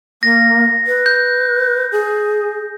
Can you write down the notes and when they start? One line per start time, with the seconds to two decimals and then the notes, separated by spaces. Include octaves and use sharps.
0.23 A#3 A#6
0.87 B4
1.06 G6
1.92 G#4